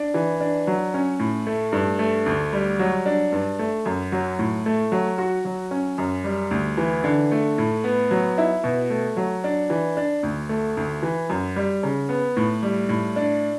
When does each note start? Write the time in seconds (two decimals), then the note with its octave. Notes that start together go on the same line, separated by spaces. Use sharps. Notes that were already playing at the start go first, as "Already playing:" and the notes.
Already playing: D4
0.14 E3
0.41 D4
0.67 F#3
0.94 C#4
1.19 A2
1.47 A3
1.72 G2
1.99 A3
2.26 D2
2.53 G3
2.79 F#3
3.06 D4
3.32 G2
3.59 A3
3.85 F#2
4.12 F#3
4.39 A2
4.66 A3
4.92 F#3
5.18 F#4
5.45 F#3
5.71 C#4
5.98 F#2
6.24 G3
6.51 D2
6.77 E3
7.04 D3
7.32 A3
7.58 A2
7.84 B3
8.11 F#3
8.38 E4
8.64 B2
8.90 A3
9.17 F#3
9.44 D4
9.70 E3
9.97 D4
10.23 D2
10.49 A3
10.77 D2
11.02 E3
11.29 F#2
11.56 G3
11.83 C#3
12.09 B3
12.36 A2
12.63 G3
12.89 A2
13.16 D4